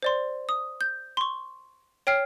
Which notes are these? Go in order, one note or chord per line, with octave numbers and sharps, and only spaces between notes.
C5 D5 C6
D#6
G6
C6 C#6
C#5 G5 F6 C7